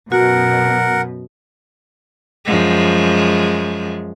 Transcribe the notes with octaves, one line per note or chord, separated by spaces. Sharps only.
F#2 B2 F#4 A#4 F#5
F#2 F3 G#3